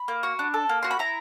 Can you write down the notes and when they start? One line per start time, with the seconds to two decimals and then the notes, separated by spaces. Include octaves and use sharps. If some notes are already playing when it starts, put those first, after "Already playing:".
Already playing: B5
0.08 A#3
0.23 F#4
0.39 D4
0.54 A4
0.69 A#3
0.83 F#4 C6
0.91 B5
0.99 E4 A#5